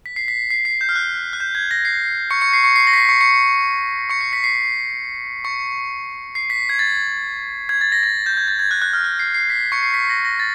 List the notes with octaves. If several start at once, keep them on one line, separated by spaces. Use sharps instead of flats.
B6
C7
B6
C7
C7
G6
F6
F#6
F#6
G6
G#6
A#6
C7
C#6 C#7
C#6 C#7
C7
C#6 C#7
C7
A#6
B6
C7
C#6 C#7
C#6 C#7
C#6 C#7
C7
B6
C7
C#6 C#7
C7
B6
G#6
A6
G#6
A6
A#6
A6
G6
G#6
A6
G#6
F#6
F#6
F6
F#6
C7
C7
B6
C#6 C#7
C7
B6
A#6
A#6
A6